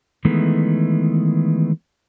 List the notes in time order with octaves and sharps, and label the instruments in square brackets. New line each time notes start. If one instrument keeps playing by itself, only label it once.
[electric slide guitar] D#3 E3 G#3 A3 B3